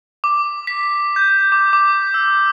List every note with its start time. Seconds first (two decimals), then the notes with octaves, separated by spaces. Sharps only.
0.24 D6
0.67 B6
1.16 G6
1.52 D6
1.73 D6
2.14 E6